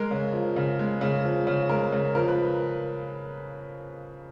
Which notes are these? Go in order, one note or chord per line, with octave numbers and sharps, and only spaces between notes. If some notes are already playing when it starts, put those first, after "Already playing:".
Already playing: G#3 A#4
C#3
F3
C#3
G#3
C#3
F3
C#3
G#3 A#4
C#3
F3 A#4
B4